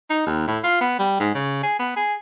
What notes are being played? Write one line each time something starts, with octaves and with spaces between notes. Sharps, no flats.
D#4
D#2
A2
F4
B3
G3
G#2
C#3
G#4
B3
G#4